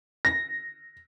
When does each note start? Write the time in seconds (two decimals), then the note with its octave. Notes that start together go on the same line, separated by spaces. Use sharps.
0.25 A#6